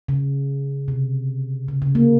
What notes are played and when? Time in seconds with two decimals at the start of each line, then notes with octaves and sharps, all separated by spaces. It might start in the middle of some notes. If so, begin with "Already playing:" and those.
0.09 C#3
0.88 C3
1.68 C#3
1.82 C#3
1.95 A#3